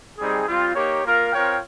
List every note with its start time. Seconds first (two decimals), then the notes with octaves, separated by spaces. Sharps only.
0.18 G3 C4 D#4 G#4
0.47 G3 C4 F4
0.75 A#3 D#4 G4 C#5
1.03 A#3 F4 A#4 F5
1.32 C4 F4 A#4 C#5 G5